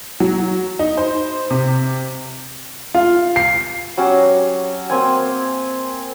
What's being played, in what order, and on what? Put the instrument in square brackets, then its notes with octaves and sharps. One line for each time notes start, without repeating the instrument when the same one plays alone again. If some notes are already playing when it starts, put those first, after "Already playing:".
[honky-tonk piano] F#3
D#4
C5
C3
[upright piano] F4
C7
[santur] F#3 C#4 G4
A#3 C4 G#5